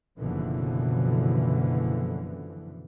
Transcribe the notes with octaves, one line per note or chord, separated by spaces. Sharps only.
F#1 B2 D3 E3 F3